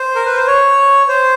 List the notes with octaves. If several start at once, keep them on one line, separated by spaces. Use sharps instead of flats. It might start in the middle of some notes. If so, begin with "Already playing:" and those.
Already playing: C5
A#4
B4
C5
C#5
C5